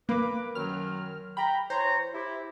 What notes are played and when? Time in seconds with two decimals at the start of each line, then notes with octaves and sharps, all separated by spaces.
0.09 A#3 B4 D6
0.55 F#2 D#3 F#3 F6
1.37 G5 A#5 B5
1.70 E3 C5 C#5 A#5
2.13 E4 G4